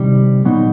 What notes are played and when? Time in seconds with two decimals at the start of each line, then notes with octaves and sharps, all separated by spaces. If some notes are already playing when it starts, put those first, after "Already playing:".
Already playing: C3 D#3 G3
0.45 A#2 F#3 B3 D#4